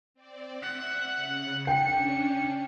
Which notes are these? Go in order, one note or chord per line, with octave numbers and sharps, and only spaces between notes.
C4 D5
E5 F#5
C#3
C#4 D4 G5 C#7